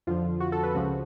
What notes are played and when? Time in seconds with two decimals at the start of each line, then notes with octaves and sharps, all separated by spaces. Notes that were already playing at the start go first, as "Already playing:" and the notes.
0.07 F2 D3 F3 F4
0.41 F#4
0.52 A4
0.63 B4
0.74 C#2 C#3 F3 F#4